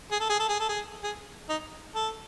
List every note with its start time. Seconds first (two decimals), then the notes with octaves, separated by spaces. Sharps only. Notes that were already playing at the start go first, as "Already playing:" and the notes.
0.11 G#4
0.20 A4
0.30 G#4
0.40 A4
0.49 G#4
0.60 A4
0.69 G#4
1.04 G#4
1.49 D#4
1.95 A4